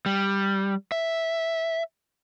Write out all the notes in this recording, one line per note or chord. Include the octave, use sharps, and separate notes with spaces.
G3
E5